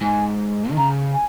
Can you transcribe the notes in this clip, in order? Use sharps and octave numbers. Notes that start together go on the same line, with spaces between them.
G#2 G#5
D#3
C#3 A#5
G#5